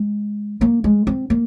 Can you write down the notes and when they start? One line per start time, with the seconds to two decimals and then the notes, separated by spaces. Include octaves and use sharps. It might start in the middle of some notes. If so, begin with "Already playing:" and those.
Already playing: G#3
0.61 A#3
0.84 G#3
1.07 C4
1.30 A#3